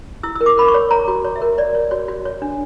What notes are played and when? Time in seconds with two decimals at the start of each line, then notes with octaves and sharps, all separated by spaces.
0.23 E4 E6
0.35 E6
0.41 A#4
0.46 D6
0.57 A#4 B5
0.68 C#6
0.74 C#5
0.91 C#5 A#5
1.08 F#4
1.25 C#5
1.36 E5
1.42 A#4
1.58 C#5 D5
1.75 C#5
1.91 F#4 C#5
2.08 F#4
2.25 C#5
2.42 D4